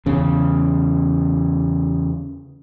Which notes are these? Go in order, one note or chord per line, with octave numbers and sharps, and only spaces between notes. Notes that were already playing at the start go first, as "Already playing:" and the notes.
E2 C#3